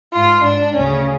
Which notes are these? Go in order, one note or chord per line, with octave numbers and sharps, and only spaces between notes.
G#2 F4
G#2 D4
D2 C#3 C#4